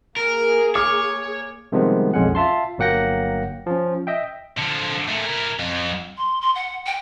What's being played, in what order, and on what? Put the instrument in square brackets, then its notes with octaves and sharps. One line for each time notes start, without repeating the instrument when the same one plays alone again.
[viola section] A#3 G#4 [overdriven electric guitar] A#4
[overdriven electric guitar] C#5 [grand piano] D6 F6
[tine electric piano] C3 D#3 F3 G3 G#3 B3
B1 F2 G#3 C#4 F#5
F4 E5 A5 C6
G1 F#3 A#3 F#5 G5 A#6
F3 C#4
D#5 E5 G5
[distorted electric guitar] D3 F3
A#2 A3
E4 A#4
F2
[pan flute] C6
C6
F#5
G5